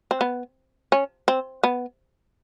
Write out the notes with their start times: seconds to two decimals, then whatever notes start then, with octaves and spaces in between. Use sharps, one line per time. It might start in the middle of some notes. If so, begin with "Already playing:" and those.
0.11 C4
0.21 B3
0.92 C#4
1.28 C4
1.63 B3